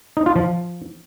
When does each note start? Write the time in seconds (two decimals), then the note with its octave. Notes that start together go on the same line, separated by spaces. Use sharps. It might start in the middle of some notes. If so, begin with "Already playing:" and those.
0.17 D#4
0.26 F4
0.36 F3